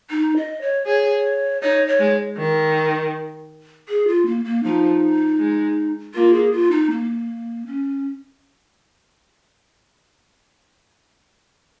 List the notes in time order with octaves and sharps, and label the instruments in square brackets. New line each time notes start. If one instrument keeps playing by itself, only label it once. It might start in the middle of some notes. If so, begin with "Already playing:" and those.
[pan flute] D#4
D#5
C#5
[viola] G#4 [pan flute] C#5
[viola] D#4 [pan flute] C#5
[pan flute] C#5
[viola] G#3
D#3
[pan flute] G#4
F4
A#3
A#3
[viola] F3 [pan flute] D#4
[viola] G#3
[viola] A#3 [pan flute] F4
[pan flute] G#4
F4
D#4
A#3
C#4